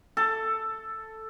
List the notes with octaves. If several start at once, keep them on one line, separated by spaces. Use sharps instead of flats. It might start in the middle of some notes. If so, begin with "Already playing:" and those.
A4